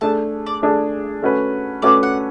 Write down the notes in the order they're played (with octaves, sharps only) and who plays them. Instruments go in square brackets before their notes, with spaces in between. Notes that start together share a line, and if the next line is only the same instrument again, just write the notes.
[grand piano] A3 D4 G#4 [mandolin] A5
[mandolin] D5
[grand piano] A3 D4 G#4
A3 C#4 F#4 B4
[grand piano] A3 C#4 F#4 B4 [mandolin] D5
[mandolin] F#5